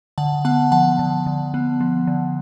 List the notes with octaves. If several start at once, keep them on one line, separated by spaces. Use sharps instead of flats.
D3 F#5 A5
B3 F#5 A5
F3 F#5 A5
D3
D3
B3
F3
D3